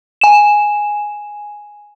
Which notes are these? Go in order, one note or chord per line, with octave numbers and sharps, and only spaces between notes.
G#5 E7